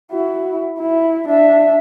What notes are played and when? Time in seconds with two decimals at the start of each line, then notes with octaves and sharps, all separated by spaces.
0.12 E4 F#4
0.80 E4
1.29 D4 E5